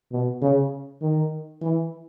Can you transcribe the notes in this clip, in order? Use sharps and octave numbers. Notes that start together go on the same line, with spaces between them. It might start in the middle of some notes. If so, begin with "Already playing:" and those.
B2
C#3
D#3
E3